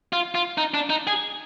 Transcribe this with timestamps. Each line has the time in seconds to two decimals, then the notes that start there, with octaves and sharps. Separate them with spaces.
0.13 F4
0.35 F4
0.58 D#4
0.74 D4
0.90 D#4
1.07 G#4